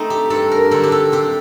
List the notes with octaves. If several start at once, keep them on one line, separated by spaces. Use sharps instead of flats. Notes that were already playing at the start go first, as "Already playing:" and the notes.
Already playing: A3 C4 D#4
G4
G2 A4
A#4
D3 F#3 C4 A4
G4
A4
C3 G4